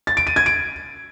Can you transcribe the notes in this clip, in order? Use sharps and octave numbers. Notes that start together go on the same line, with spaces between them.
A6
D7
D#7
G#6
D7